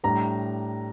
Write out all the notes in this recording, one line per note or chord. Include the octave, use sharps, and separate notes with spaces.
A2 G3 D4 A#5